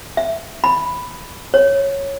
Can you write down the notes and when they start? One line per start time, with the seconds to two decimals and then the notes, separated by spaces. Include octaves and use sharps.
0.17 E5
0.64 B5
1.54 C#5